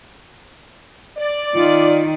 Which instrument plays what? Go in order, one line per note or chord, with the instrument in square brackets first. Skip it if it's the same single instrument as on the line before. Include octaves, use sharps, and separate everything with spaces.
[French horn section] D5
[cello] D#3 [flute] F4